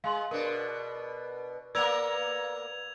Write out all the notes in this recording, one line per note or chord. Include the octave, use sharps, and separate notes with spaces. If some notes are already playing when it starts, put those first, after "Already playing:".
G#3 F5 C6 F#7
B2 D4 A#4
A#3 B3 A#4 D5 E6 G#6 F7